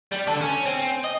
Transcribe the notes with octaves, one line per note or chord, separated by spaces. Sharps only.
G3
D3 A4
C#4
C4
D#5